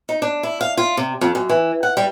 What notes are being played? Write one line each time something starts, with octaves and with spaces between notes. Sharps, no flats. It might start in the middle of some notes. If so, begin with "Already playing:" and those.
D#4
D4
E4
F5
F4
C3
F2
F#2
E3
F#5
G3